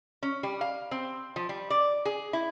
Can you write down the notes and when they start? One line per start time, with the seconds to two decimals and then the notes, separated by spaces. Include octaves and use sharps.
0.23 C#4
0.43 G3
0.61 F5
0.91 C4
1.36 F3
1.49 G3
1.70 D5
2.05 G#4
2.33 E4